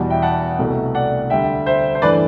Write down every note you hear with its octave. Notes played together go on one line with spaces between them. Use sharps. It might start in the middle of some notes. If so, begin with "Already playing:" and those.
Already playing: E2 B2 G3
E5 G5
F#5 A5
C2 B2 A3
D5 F#5
D2 D3 G3 E5 G5
C5 E5
C5
G2 E3 A3 B4 D5